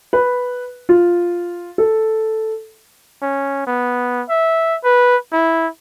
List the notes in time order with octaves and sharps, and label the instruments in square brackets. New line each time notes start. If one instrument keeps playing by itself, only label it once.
[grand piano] B4
F4
A4
[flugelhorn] C#4
B3
E5
B4
E4